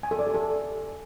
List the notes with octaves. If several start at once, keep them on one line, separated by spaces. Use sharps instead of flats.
G#5
A4
D5
G4
A4